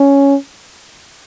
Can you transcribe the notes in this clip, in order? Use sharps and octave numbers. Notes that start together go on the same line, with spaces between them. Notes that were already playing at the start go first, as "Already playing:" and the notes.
Already playing: C#4